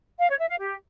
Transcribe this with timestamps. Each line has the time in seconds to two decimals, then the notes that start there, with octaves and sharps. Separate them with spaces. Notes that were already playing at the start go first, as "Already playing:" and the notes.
0.20 F5
0.29 C#5
0.39 E5
0.49 F5
0.58 G4